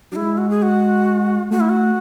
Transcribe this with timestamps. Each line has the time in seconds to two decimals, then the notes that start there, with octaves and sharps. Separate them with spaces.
0.11 F#3 D4
0.16 G#3 E4
0.38 F#4
0.50 G#4
0.62 F#4
1.51 A3 F#4
1.60 E4
1.69 F#4